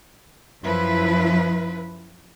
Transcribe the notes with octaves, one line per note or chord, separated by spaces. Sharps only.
F#2 F3 E4 B4